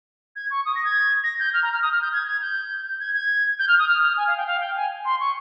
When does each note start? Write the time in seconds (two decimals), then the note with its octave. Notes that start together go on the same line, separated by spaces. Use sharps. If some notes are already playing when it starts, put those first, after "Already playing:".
0.36 G#6
0.50 C#6
0.65 D#6
0.75 A#6
0.85 G#6
1.23 A#6
1.39 G6
1.53 F6
1.63 A#5
1.73 F6
1.82 D#6
1.92 F6
2.02 G6
2.13 G#6
2.27 G#6
2.41 G6
3.00 G#6
3.14 G#6
3.59 G6
3.68 F6
3.79 D#6
3.87 F6
4.02 F6
4.17 G#5
4.27 F5
4.37 G5
4.46 F5
4.60 G5
4.76 G#5
5.05 C6
5.20 C#6